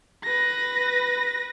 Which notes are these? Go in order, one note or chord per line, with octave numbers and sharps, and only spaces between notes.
B4 A#6